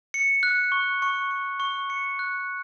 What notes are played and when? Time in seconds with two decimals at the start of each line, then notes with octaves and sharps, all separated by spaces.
0.14 C#7
0.43 F#6
0.72 C#6
1.02 C#6
1.31 C#6
1.60 C#6
1.90 C#7
2.19 F#6